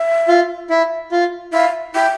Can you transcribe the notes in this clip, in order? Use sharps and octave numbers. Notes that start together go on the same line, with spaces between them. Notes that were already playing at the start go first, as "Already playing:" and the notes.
Already playing: E5
F4
E4
F4
E4 F5
E4 G5